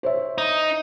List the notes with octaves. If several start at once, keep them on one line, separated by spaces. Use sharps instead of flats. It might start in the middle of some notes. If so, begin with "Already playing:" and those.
C5 C#5 E5
D#4